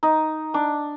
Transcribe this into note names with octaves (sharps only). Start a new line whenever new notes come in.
D#4
D4